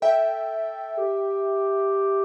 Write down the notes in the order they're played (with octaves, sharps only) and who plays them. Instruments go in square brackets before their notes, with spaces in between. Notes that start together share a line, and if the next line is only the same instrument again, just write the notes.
[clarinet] A4 [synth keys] E5 G5
[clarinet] G4